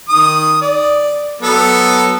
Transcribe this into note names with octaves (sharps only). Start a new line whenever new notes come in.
D#3 D#6
D5
F#3 B3 A4